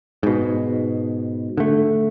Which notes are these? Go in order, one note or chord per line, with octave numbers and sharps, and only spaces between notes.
G#2 B2
D3 A3